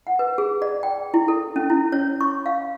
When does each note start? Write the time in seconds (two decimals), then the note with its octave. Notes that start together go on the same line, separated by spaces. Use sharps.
0.07 F#5
0.19 B4
0.38 G#4
0.62 D5
0.83 G5
1.14 E4
1.28 A4
1.56 C#4
1.70 E4
1.92 C#5
2.21 C#6
2.46 F5